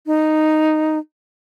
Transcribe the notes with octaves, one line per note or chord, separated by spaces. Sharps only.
D#4